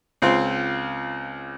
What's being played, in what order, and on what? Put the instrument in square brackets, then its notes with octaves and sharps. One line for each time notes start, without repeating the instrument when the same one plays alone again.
[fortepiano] C#2 C4 F4 C6